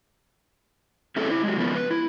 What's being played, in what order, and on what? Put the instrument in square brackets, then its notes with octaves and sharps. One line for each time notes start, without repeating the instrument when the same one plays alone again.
[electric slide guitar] A3 C4 C#4 E4 G#4 A4
E4 C5
F#3 G#3
C#3 F3 B3 A#4
B4
E4